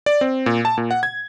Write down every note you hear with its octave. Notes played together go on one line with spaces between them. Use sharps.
D5
C4
A#2
A5
A#2
F#5
G#6